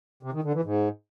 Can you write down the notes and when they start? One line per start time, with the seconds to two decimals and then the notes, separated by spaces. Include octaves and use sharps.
0.23 C3
0.33 D#3
0.44 D3
0.54 E3
0.64 G#2